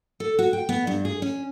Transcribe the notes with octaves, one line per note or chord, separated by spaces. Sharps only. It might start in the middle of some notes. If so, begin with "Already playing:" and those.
A4
F#4
G5
B3
G2
G#4
C#4